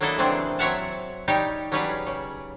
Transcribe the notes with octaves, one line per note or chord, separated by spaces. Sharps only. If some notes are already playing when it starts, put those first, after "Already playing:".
F#3 A#3 D4 E4 A4 D#5
C#3 E3 F#3 C4 D4 G#4
F#3 C4 C#5 E5 F#5 A5
G3 D#4 G4 C#5
F#3 G3 C#4 G4 G#4 B4
C#3